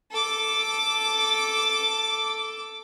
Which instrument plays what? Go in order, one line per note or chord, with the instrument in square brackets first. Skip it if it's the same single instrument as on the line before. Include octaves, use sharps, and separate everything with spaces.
[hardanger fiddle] A4 D6